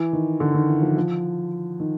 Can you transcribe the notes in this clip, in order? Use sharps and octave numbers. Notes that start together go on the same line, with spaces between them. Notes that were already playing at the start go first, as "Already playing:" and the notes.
Already playing: E3
D#3
D3
D#3
E3
F3
F3
D#3